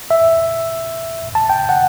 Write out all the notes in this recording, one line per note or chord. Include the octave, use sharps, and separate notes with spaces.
E5
A5
G5
F#5